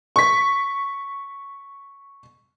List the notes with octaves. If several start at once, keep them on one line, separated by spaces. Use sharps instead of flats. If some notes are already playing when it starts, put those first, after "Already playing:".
C#6 B6